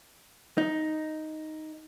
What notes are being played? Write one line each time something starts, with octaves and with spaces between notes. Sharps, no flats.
D#4